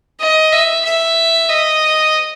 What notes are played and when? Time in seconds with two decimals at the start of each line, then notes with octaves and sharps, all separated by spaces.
0.20 D#5
0.52 E5
0.85 E5
1.49 D#5